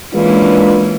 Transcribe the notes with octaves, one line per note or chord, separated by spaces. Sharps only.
E3 G#3 A#3 C#4 D4 F4 B4